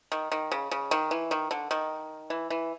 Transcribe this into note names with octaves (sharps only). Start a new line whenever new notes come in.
D#3
D#3
C#3
C#3
D#3
E3
D#3
D3
D#3
E3
E3